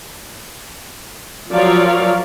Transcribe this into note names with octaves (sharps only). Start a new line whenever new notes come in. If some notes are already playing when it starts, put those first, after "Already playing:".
F3 F#3 A#4 C#5 D5 F5